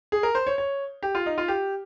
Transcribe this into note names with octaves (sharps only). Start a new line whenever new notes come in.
G#4
A#4
C5
C#5
C#5
G4
F4
D#4
F4
G4